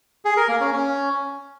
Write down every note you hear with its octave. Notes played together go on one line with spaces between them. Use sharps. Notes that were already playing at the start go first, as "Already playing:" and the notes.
G#4
A#4
A#3
C#4
C#4